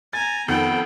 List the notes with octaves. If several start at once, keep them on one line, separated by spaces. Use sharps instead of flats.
G#5 A#5 A6
F2 D#3 B3 A4 G5